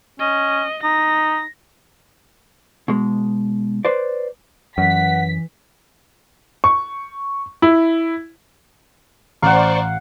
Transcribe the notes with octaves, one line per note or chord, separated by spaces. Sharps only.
C#4 D#5
D#4 A#6
B2 G#3
B4 C5 D5
F#2 E3 F#5 B6
C#6
E4
A1 C5 D5 F5 F#5 A#5 C#6